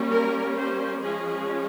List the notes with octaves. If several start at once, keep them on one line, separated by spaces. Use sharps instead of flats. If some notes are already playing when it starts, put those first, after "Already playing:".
Already playing: G3 A#3 C#4
A#4
C5
F3 G#3 C#4 G#4